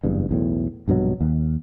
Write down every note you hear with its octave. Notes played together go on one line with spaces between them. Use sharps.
F#1 E2 G2
B1 E2 A2
A#1 G2 B2 F#3
D#2